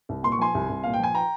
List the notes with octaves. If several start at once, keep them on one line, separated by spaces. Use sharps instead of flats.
C2
A#2 C6
C#6
F3 G#5 C6
C2
C2
A#2 F5
G5
F3 G#5
G5 A#5